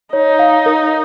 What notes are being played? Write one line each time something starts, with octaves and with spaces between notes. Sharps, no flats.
D#4 C#5
F5
A#4